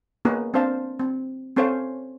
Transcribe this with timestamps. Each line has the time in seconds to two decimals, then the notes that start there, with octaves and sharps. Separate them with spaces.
0.25 A#3 B3 C#4 D#4 G#4 B4
0.54 C4 D4 A#4 C5 F5 A5
0.99 C4
1.56 C4 C#4 A4 C5 C#5 F5